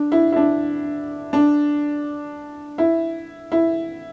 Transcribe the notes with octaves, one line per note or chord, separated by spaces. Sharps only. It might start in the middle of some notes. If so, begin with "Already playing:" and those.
Already playing: D4
E4
E4
D4
D4
E4
E4